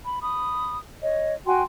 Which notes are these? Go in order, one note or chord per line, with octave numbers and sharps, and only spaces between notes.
B5
B5 D#6
C#5 D#5
F#4 G5 G#5 C6